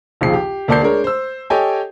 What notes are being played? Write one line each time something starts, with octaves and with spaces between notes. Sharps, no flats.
A#1 D#2 C#3 F3 C7
G4
D2 A#3 D5 A5 G6 C7
G#3 D4 A#4 C#5
C5 E6
G4 A4 C#5 D#5 G5 G#5